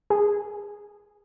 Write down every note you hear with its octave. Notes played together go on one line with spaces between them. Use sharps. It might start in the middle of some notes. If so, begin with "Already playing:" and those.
G#4